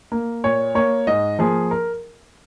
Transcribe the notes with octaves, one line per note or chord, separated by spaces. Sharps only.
A#3
A#2 C#5
A#3 C#5
G#2 D#5
F3 A#3 G#4
A#4